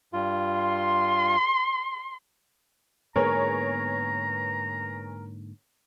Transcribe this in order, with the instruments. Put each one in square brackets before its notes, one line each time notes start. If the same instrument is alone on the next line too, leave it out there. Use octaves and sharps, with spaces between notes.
[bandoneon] G2 F4
[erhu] C6
[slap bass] G#2 D3 A#3 [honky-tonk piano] B3 G#4 C#5 [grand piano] A#4 [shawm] A#5